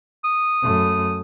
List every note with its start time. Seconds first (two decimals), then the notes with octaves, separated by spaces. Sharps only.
0.24 D#6
0.62 F#2 A3